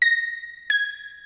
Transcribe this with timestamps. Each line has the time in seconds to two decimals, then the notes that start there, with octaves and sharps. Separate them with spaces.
0.02 A#6
0.70 G#6